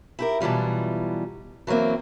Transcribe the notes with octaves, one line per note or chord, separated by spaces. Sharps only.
E4 G4 A#4
B2 E3 F#3 G3 F4
E3 F#3 G3 A#3 C4